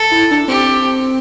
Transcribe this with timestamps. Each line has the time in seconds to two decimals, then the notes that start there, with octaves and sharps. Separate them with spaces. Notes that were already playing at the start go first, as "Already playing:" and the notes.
Already playing: A4
0.11 E4
0.31 D4
0.48 C4 G4